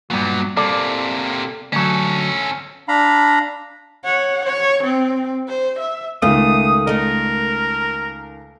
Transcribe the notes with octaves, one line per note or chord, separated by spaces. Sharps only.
G2 A#2 F#3 B3
C3 A#3 A4 D5
D2 F#3 C#4 A4
D4 F5 A#5 B5
C#5 F#5
C#5
C4
C5
E5
C#2 D#3 A3 D#6
A3 A#4 D#5